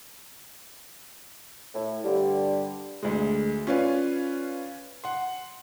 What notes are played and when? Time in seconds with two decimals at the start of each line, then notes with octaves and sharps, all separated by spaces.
1.75 A2
2.04 G2 D3 G3
3.03 D2 G#3
3.67 C#4 F4 B4 C#5 D5 F5
5.04 F#5 C6